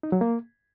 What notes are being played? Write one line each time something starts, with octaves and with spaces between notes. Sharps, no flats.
D#4
F#3
A#3